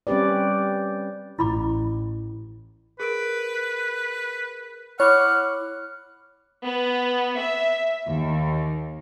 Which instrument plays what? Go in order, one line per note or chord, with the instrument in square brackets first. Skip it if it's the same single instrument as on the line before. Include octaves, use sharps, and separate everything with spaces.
[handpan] G3 C4 C#4 G4 B4 D5
[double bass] A1 [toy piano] E4 B5 D6
[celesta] G#4 A#4 D7 [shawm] B4
[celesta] E4 B5 D6 [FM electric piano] C#5 [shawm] F#5 [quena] F6
[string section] B3
E5
D#2